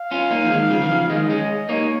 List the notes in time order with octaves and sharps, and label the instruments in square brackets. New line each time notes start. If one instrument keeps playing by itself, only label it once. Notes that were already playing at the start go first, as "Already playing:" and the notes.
Already playing: [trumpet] F5
[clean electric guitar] C#4 F4
A#3 D#4
F3
D#3 G#3
C#3 F3
D#3
C#3 F3
[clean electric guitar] D#3 G#3 [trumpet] D#5
[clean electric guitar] G#3 C#4
[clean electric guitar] A#3 D#4 [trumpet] C#5